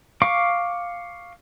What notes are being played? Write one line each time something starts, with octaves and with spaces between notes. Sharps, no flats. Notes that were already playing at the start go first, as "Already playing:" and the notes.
F5 C#6 D6